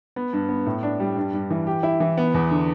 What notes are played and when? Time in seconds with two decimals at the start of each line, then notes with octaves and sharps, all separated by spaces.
0.16 B3
0.33 G2
0.49 B3
0.66 A2
0.83 D4
1.00 G3
1.16 G2
1.34 G2
1.50 E3
1.67 G4
1.83 E4
2.00 E3
2.17 B3
2.34 E2
2.51 D3